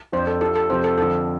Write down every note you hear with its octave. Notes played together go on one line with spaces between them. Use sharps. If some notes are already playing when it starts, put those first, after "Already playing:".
F2 F3 D4 C5
A4
F3 D4 G4 A4
A4
F2 C3 F3 C5
A4
F2 D3 F3 A4